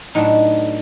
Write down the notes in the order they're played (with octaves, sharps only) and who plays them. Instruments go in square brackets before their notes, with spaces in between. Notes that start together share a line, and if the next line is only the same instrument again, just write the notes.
[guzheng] A2 F#3 B3 D4 D#4